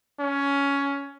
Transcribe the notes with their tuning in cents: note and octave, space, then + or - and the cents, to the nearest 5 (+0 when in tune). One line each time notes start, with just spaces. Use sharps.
C#4 +15